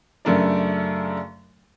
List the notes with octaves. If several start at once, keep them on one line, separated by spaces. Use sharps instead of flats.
F#2 C#3 A3 D4 A#4 D5